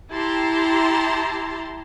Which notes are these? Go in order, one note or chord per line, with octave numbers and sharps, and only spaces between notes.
E4 G4 A5 A#5 C6